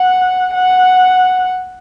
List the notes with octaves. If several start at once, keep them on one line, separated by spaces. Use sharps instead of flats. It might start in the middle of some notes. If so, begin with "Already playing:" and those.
Already playing: F#5
F#5